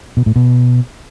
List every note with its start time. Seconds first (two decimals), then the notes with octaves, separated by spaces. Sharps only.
0.17 B2
0.26 A2
0.36 B2